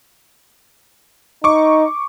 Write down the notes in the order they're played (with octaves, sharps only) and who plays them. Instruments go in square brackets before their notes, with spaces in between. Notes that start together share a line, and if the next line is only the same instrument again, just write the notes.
[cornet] D#4 [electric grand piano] C#6 D6